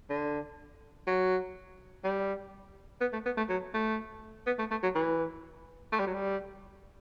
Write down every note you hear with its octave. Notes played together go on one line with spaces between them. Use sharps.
D3
F#3
G3
B3
A3
B3
A3
F#3
A3
B3
A3
A3
F#3
E3
A3
G3
F#3
G3